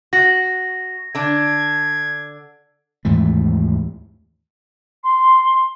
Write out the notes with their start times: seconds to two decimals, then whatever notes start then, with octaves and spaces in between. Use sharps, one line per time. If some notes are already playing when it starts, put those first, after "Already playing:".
0.13 F#4 A#6
1.15 D3 D4 G#6
3.05 D#2 G#2 E3 A3
5.03 C6